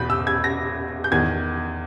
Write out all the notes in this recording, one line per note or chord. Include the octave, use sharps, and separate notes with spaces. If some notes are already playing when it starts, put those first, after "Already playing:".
Already playing: E2 B2 B5 G6
E6
G#6
A#6
G6
E2 D#3 G#6